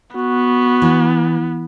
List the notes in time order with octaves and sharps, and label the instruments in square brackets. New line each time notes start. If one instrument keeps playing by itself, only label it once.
[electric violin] B3 [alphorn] F#4
[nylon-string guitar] E3